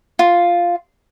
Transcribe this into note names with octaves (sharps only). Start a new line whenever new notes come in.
F4